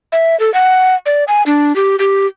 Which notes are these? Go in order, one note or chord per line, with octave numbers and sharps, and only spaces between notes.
E5
A4
F#5
D5
G#5
D4
G4
G4